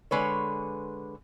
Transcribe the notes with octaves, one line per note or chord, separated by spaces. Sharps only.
D3 G#3 B4 C#5